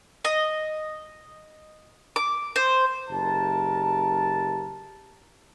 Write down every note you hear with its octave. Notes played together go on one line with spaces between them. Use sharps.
D#5
D6
C5
F#1 G4 A#4 A5